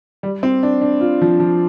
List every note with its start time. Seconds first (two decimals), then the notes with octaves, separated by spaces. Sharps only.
0.23 G3
0.43 C4
0.63 D4
0.82 D4
1.01 F4
1.21 F3
1.40 F3